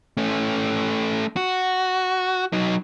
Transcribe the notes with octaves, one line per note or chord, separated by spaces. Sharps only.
A3 C#4
F#4
F#3 D#4